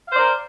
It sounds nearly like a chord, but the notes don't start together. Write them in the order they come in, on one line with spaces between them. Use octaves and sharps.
F5 C5 D5 A#4